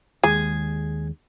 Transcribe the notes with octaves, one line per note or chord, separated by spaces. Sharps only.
D#2 G#3 G#4